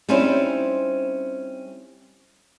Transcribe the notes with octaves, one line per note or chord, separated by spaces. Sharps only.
G3 C4 C#4 D#4 E4 C5